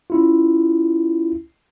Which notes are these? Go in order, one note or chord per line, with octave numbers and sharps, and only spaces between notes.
C#4 E4 F4